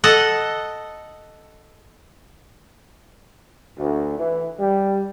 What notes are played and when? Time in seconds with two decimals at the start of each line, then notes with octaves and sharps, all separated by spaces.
0.04 A4 D#5 F#5
3.78 D2
4.18 E3
4.60 G3